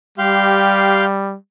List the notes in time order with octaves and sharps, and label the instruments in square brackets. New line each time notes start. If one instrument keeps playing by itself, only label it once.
[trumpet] G3 [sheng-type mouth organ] G4 F5 C6